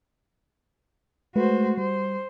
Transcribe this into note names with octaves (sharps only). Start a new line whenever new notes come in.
G#3 A3 F#4 B4 C5
G3 C5